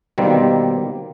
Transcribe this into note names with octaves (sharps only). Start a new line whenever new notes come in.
B2 D#3 G3 A#3 C4